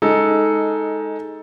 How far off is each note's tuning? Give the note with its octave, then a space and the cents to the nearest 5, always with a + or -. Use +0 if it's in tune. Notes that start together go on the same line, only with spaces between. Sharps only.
G#3 +0 D#4 +15 A4 +0